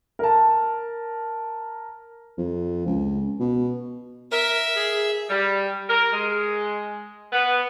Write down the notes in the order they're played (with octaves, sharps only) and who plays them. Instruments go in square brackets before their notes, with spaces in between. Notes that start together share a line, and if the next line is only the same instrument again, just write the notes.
[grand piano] A#4 A5
[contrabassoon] F2
C#2
B2
[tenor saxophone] A#4 [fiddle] E5
[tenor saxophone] G#4
[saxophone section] G3
A#4
G#3
B3